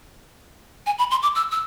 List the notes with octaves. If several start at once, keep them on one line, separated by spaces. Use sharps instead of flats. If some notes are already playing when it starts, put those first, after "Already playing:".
G#5
B5
C6
D6
E6
E6